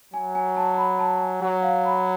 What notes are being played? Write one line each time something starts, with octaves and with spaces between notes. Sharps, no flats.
F#3 G#5
G#5
A5
B5
A5
G#5
F#3 F#5
F5
B5